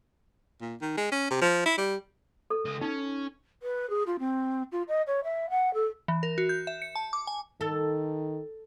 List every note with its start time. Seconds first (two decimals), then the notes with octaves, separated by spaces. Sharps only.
0.62 A#2
0.82 D#3
0.97 G#3
1.12 C#4
1.30 C3
1.42 F3
1.66 E4
1.78 G3
2.50 A4
2.65 C#2 D#5
2.81 C#4 D#4
3.63 B4
3.90 G#4
4.07 F4
4.19 C4
4.72 F4
4.88 D#5
5.07 C#5
5.24 E5
5.50 F#5
5.74 A4
6.08 E3
6.23 A#4
6.38 F#4
6.49 G6
6.67 E5
6.82 C#7
6.95 A5
7.13 D6
7.27 G#5
7.61 D#3 A4